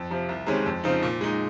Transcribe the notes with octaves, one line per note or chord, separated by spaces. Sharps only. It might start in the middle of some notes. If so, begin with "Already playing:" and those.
Already playing: F2
C3 F3
C2
C3 D#3 G#3 C#4
F2
C#3 F3 C4 D#4
A#2
G#3 D#4